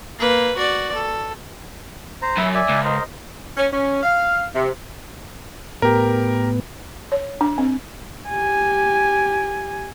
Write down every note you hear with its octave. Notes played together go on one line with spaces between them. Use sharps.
A#3 B4
F#4 D5
A4
C5 A#5
F#2 E5 B5
D5 E5 G#5
C#2
A#4 C5 D#5
C#4
C#4
F5
C3
A2 B3 G4 A#4
C#5
D4
C4
G4 G#5